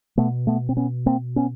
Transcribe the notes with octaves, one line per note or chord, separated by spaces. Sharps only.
B2 A3 B3
A3 B3
C4
B3 C#4
A#3 C4
B3 C#4